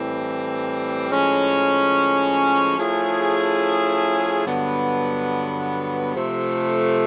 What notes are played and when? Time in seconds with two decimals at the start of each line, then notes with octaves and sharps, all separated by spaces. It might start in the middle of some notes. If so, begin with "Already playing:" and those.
Already playing: A2 E3 G3 C4
1.09 A2 F3 G#3 C#4
2.77 F3 A3 C#4 E4 G#4
4.46 G2 D3 F#3 B3
6.15 C3 F3 A3